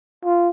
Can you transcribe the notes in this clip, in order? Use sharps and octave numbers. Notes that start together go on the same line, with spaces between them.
F4